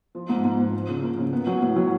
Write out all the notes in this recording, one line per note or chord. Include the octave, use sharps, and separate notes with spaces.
F3
G#2
G#2
F3
F3
C#3
A#3
C#3
B3
F#3
A2
F#3